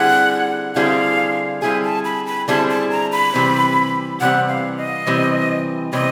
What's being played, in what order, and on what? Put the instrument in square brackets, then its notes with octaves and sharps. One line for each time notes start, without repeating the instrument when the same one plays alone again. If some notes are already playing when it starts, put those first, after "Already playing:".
Already playing: [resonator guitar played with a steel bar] D3 G3 C4 E4 G#4 [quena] F#5
[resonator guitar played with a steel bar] D3 G3 C4 E4 G#4 [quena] F5
[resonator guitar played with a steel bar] D3 G3 C4 E4 G#4 [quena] G#5
[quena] A5
B5
B5
[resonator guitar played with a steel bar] D3 G3 C4 E4 G#4 [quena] A5
[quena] A5
A#5
B5
[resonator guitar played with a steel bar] C3 E3 G3 C4
[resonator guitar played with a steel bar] C3 E3 G3 C4 [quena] F#5
[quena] F5
D#5
[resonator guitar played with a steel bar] C3 E3 G3 C4
[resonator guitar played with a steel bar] C3 E3 G3 C4 [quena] D#5